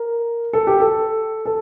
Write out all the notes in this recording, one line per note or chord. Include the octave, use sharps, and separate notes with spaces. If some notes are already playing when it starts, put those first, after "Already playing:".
Already playing: A#4
A4
G4
A4
A4